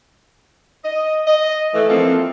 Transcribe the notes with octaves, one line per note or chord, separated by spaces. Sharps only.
D#5
D#5
E3 A3
E3 F3 A#3 C4 A4